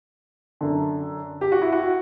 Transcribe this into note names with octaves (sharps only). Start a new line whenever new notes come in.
F#2 D3
G4
F#4
E4
F#4